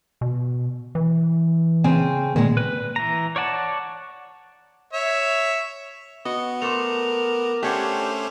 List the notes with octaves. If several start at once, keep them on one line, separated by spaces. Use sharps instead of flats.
B2
E3
C#3 C4 G#5
A#2 D#3 G#3
B4
E3 A#5
C#5 D5 F#5 A5
C#5 E5
B3 F#4 D#5
A3 A#4 C5 D6 F7
A3 C#4 D4 G4 C5 C#5 F#5